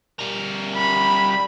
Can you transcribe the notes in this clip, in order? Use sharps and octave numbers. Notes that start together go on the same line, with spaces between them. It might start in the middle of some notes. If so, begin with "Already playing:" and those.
G3 A#4
B5